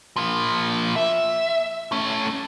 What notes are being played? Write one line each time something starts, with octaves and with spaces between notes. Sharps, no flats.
F3 A#3
E5
A3 C#4